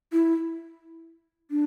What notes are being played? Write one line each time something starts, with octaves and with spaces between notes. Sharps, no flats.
E4
D4